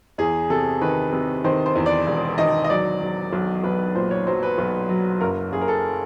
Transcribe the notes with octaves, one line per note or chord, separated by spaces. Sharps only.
E2 G#4
C3 A4
D#3 B4
C3
D#3 C5
C5
E2
D5
E1
D#3 D#5
D#5
F#3 D5
F#3
B1
B1 B4
A#2 C5
C#5
F#3 C5
B4
B1
F#3
F#1 A#4
F#1 G#4
A#4
A4